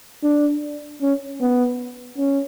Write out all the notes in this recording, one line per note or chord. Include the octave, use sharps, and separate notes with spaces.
D4
C#4
B3
C#4